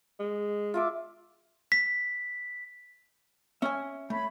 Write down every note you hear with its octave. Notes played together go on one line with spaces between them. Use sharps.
G#3
F4 E5 D6
B6
C#4 E5 G#5
A3 C#5 B5